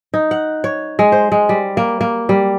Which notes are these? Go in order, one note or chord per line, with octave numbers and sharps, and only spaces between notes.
D#4
F#5
C#5
G#3
C5
G#3
G3
A#3
A#3
G3